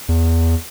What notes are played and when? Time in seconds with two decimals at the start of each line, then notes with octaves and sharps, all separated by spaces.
0.09 E2